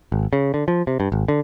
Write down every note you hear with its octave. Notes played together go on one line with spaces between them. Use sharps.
G#1
C#3
D3
F3
C3
G2
G#1
D3